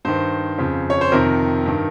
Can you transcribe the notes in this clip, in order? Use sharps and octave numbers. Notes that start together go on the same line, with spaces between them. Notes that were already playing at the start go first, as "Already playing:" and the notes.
G2 D#3 C5
F2 C#3
C#5
C5
F2 C3 D#3 A#4
G2 D#3